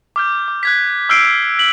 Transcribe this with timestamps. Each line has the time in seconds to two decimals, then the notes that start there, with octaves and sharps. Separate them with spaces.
0.16 D6 F6 G6
0.48 D6
0.63 F#6 G#6 B6
1.09 D6 E6 F6 G6 C7 D7
1.59 B6 F#7